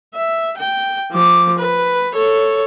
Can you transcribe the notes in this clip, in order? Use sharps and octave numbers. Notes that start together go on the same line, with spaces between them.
E5
G5
F3 D6
B4
A4 C#5